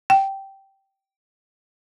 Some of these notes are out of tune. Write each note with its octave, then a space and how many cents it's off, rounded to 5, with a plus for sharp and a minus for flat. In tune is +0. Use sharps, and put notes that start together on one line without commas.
G5 -10